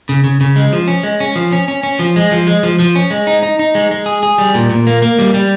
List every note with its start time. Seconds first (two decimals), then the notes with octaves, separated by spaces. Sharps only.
0.09 C#3
0.24 C#3
0.41 C#3
0.56 G#3
0.73 F3
0.88 C#4
1.03 G#3
1.20 C#4
1.36 F3
1.52 C#4
1.68 C#4
1.83 C#4
1.99 F3
2.16 G#3
2.31 F3
2.47 G#3
2.63 F3
2.79 F3
2.95 C#4
3.11 G#3
3.27 D#4
3.43 D#4
3.59 D#4
3.75 G#3
3.91 G#3
4.06 G#4
4.23 G#4
4.38 G3
4.55 A#2
4.70 A#2
4.87 A#3
5.02 A#3
5.19 G3
5.34 G3